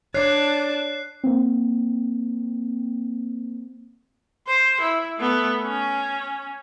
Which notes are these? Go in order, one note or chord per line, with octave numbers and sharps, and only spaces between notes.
D4 C#5 D5 A5 F#6 C7
A#3 C4
C5
E4
A3 B3
C#4